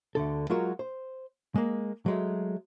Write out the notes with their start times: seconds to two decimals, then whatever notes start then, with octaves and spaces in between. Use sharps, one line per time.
0.15 D2 D3 A4
0.50 F#3 G#3 F4 F#4 A#4
0.79 C5
1.56 G#3 A#3
2.06 F#3 G#3 A3